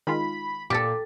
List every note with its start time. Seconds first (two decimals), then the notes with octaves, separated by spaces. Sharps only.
0.07 D#3 G#3 F4 B5
0.70 A#2 G4 A4 D6 A6